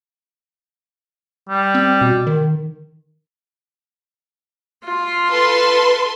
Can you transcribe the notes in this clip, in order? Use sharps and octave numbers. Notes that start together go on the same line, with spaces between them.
G3
C4
B2
D#3
F4
A4 B4 C6